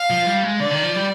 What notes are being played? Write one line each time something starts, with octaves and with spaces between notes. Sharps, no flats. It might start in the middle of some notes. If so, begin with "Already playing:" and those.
Already playing: F5
F3
G3
G#3
D3 D5
D#3
F3
G3